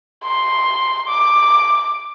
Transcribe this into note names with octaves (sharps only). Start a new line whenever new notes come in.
C6
D6